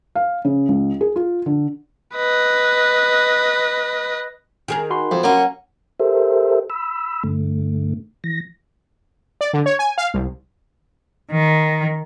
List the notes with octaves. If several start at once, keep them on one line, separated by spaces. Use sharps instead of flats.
F5
C#3
C#2
G#4
F4
D3
B4 D#5
D#3 G#4 A#4
F#4 B5 C6
F2
F#3 A#3 C#4 F#5
G4 A4 A#4 C5 E5
B5 E6
G2 D3 A3
E3 A#6
D5
D3
C#5
G#5
F5
C2
D#3